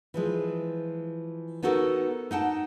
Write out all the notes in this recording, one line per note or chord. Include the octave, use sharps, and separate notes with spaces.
E3 F3 G#3
B3 D#4 F#4 A4 A#4
D#4 F#5 G5 A5